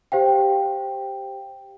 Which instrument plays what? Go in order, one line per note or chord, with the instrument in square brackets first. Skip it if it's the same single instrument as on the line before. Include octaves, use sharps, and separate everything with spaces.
[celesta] G4 C5 F5 G5